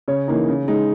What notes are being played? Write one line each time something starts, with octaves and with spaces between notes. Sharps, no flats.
C#3 C#5
E3 A#3 D#4
C#3
G#3 D#4